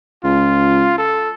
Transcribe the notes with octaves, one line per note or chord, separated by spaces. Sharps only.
C#2 F4
A4